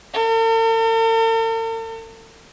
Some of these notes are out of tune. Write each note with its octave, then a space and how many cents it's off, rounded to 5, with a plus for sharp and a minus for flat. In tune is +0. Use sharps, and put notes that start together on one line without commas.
A4 +45